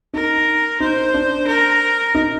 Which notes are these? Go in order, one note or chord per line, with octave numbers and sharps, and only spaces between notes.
D#4 A#4
D#4 C5
D4
A#4
D#4